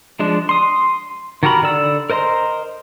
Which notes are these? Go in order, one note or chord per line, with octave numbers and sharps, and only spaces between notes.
F3 G#3 D4
C6 D#6
D#3 F#4 G4 A#4 B5
D3 D5 E6
A#4 C5 D#5 A#5 C6